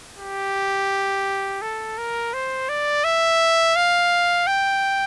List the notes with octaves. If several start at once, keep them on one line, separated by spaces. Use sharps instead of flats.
G4
A4
A#4
C5
D5
E5
F5
G5